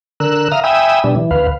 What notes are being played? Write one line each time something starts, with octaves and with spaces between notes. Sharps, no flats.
D3 A#4 E6 F#6
E5 F5 A#5 D#6 F6
E5 G5 G#5 B5 D#6 E6
B2 G3 D4
E3
D2 B4 F5